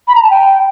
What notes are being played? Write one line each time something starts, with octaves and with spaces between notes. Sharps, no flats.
B5
A#5
A5
G5